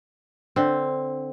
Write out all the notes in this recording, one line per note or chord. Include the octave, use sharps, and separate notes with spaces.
D3 C4